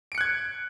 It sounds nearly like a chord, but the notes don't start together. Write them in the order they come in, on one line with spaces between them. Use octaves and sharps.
D7 C#7 F#6 G#6